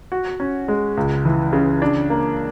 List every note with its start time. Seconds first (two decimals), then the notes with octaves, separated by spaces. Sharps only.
0.12 F#4
0.40 C#4
0.68 G#3
0.97 C#2
1.25 E3
1.53 C#3
1.82 D4
2.10 A#3